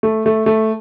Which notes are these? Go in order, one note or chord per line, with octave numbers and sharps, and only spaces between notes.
A3
A3
A3